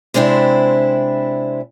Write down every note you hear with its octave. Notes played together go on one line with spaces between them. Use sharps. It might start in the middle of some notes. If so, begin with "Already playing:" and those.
C3 G#3 C4 D4 E4